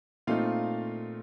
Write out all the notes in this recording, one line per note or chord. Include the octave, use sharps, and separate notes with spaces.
A#2 A3 C4 D#4 F4 F5